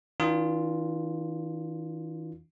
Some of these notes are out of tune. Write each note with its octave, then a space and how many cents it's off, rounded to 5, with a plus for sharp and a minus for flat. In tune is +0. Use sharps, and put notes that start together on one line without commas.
E3 -45 D4 +0 F4 +0